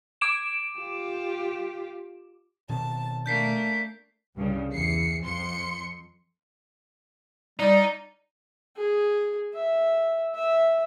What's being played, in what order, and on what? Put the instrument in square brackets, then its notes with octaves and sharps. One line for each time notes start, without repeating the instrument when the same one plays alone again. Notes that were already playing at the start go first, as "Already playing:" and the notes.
[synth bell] D6 D7 E7
[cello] F4 G4
[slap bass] B2 D#3 C4 [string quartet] A5
[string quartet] A3 A#3 D4 [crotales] G6 B6 C7
[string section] C2 G2 C#3
E2 C7 C#7
F2 C6 C#7
[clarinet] G3 [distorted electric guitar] D#4 [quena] D5
[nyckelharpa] G#4
E5
E5